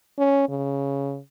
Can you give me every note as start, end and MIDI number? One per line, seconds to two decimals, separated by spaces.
0.19 0.48 61
0.49 1.18 49